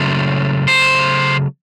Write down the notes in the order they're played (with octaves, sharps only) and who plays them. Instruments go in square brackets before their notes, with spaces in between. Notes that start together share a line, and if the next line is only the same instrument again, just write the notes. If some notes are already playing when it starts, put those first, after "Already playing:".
Already playing: [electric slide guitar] C#3 F#3 A3 C5
C5